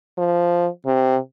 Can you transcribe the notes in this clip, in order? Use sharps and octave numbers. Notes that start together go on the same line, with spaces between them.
F3
C3